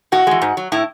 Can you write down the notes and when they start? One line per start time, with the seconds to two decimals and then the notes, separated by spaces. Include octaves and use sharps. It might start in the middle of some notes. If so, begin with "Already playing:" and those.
0.12 A2 F#4
0.27 E3 G#3
0.42 G#2
0.57 F#3
0.72 A2 E4